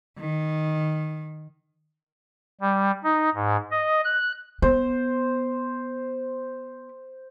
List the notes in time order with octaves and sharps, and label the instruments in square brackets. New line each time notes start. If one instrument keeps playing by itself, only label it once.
[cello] D#3
[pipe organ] G3
D#4
G#2
D#5
F#6
[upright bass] B3 [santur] C5